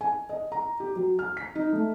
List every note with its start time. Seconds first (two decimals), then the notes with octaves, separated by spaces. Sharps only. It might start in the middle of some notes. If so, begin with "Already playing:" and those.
0.01 G#5
0.29 D#5
0.52 A#5
0.80 G4
0.96 F#3
1.19 F6
1.37 B6
1.55 D#4
1.73 A3